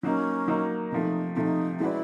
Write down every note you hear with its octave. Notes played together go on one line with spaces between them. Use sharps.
F#3 A#3 C#4 D#4
F#3 A#3 D#4
C3 F3 A3 D#4
C3 F3 A3 D#4 E4
G#3 C#4 E4 F#4 B4 D5